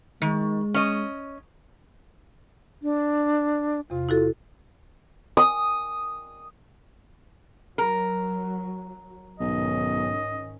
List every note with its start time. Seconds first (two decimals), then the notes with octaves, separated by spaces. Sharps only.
0.22 D#3 G#3
0.74 C#4 D#5
2.82 D4
3.90 E2 C3 F4
4.09 E4 F#4 A4
5.37 D#6
7.78 F#3 A#4
9.40 B1 G#2 D#3 C#4 D#5